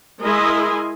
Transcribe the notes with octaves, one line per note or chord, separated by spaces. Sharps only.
G#3 E4 A#4 D#5 G#5 C6